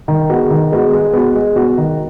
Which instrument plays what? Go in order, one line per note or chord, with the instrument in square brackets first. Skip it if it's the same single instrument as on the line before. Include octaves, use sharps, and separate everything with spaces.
[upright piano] D#3
G#3 B3 F#4
D#3
G#3 B3 F#4
G#3
B3 F#4
G#3
B3 F#4
D#3